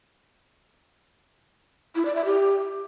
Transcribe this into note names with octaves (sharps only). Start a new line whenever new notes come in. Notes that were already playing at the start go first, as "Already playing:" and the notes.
E4
D5
E5
G4